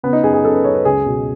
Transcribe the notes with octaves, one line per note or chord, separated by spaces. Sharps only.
C#3 B3
D#4
F#2 G#4
G#4
F#2 A4
B4
F#2 C#5
B4
C#2 G#4
B2